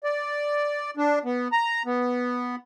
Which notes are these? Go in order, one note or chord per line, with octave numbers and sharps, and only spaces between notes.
D5
D4
B3
A#5
B3